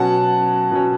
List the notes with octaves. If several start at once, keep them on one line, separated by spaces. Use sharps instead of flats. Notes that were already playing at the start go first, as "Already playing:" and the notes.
Already playing: B2 F#3 C#4 F#5 A5
B2 F#3 C#4